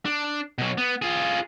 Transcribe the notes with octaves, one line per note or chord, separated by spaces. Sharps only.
D4
B2 F#3
B3
F4 G#4